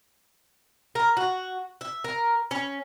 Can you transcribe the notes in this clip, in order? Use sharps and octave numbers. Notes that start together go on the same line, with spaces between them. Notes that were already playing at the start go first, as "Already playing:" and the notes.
A#4
F#4
E5
A#4
C#4